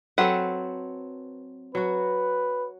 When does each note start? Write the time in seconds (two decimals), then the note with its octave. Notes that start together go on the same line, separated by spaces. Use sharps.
0.18 F#3 C4 A4 B4 F#5
1.75 F#3 F#4 B4